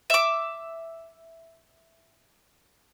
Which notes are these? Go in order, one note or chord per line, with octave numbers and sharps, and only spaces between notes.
E5 D6